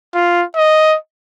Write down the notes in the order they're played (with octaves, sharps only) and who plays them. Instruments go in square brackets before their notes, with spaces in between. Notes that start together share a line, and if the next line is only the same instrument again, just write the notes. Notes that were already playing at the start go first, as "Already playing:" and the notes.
[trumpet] F4
D#5